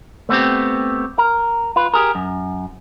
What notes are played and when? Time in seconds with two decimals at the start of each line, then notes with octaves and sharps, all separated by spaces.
0.29 A3 B3 C4 G4
1.18 A#4
1.76 F4 B4
1.94 G4 G#4 A#4
2.15 F#2